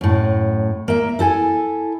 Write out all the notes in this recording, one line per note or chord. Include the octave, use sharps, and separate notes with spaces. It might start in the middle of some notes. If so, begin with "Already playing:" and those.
F#2 A2
A#3 E5
E4 A4 G5 G#5